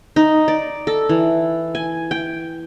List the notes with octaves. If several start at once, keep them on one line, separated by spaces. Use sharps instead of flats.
D#4
D5
A4
E3
G#5
G5